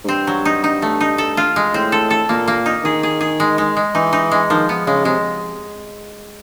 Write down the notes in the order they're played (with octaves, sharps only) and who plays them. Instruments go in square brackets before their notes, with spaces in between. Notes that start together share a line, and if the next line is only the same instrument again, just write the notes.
[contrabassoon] G#2
[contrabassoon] G2 [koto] C4
[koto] F#3
D#4
D#4
A3
D#4
A4
F4
G#3
[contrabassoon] A2 [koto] C4
[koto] A4
A4
[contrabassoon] A#2 [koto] A#3
[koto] A#3
D#4
[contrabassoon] D#3 [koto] G#4
[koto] G#4
G#4
G#3
G#3
G#3
[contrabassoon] E3 [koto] D#4
[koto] D#4
G#3
[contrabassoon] D#3 [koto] F3
[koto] B3
[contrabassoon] C#3 [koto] G#3
[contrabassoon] C3 [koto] G#3